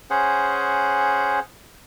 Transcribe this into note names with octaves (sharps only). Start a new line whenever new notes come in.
C#4 G#4 C5 F#5